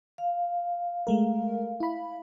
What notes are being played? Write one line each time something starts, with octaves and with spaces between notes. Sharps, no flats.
F5
G#3 A3 A#4
E4 B5